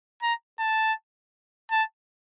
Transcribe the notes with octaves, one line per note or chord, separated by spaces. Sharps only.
A#5
A5
A5